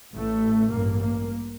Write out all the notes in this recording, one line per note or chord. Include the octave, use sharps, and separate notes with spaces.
A1 A2 A3
A1 G2 A#3
A#3